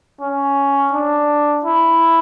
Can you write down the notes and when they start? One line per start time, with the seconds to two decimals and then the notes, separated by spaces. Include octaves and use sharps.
0.21 C#4
0.93 D4
1.65 E4